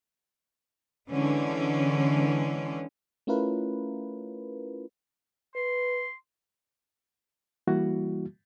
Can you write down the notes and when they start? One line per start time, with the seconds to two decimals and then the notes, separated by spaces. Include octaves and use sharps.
1.10 D3 E3 G#3 C#4
3.27 A3 C#4 E4 F4 A#4 B4
5.56 B4 C6
7.67 E3 G3 A#3 E4 F#4